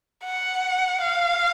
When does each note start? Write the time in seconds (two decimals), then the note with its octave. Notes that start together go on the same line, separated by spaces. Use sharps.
0.24 F#5
1.01 F5